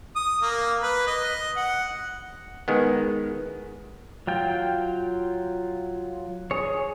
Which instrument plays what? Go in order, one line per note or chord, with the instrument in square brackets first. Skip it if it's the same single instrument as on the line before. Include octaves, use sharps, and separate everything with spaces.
[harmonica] D#6
A#3
B4
D#5
F#5
[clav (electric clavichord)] D#3 G#3 B3
[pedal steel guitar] F#3 F4 G5
G#4 C#5